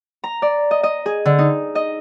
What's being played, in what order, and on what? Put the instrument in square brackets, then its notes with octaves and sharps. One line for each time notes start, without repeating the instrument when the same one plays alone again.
[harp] A#5
D5
D#5
D#5
G#4
D3
D#4
D#5